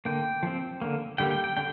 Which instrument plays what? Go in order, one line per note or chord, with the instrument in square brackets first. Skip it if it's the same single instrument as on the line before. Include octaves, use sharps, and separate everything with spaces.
[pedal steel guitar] D3 A#3 G5
F3 C4
D3 A#3
D3 G3 A#3 G5
G5
G5
D3 G5